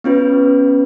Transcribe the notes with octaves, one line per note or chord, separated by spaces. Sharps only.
B3 C#4 F4 B4